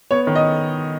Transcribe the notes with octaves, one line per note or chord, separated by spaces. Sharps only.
B3 C#5
D#3
D#5